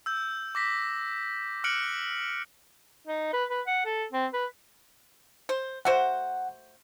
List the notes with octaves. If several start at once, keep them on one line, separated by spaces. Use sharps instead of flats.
E6 G6
D6 A#6 B6
D6 F6 F#6 C#7 D7 F#7
D#4
B4
B4
F#5
A4
C4
B4
C5
A3 F#4 C5 F#5